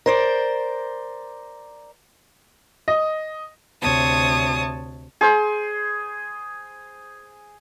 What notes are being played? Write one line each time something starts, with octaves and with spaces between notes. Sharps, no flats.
A#4 C5 D5
D#5
D2 C3 C#5 A5 D#6
G#4 C5